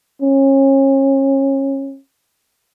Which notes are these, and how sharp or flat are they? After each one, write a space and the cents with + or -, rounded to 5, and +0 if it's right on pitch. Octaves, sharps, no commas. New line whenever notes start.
C#4 -30